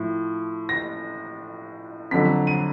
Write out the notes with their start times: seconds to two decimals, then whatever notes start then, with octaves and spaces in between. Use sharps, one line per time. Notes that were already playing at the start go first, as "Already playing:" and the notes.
Already playing: A2 F3
0.69 A#6
2.11 F2 D3 F#3 B6
2.47 D#7